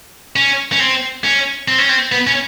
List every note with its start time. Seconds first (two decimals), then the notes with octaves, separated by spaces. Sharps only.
0.36 C#4
0.72 C#4
0.80 C4
1.24 C#4
1.68 C4
1.78 C#4
1.89 C4
2.12 B3
2.27 C#4